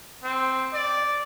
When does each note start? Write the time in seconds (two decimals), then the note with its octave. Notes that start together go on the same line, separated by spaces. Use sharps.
0.23 C4
0.73 D5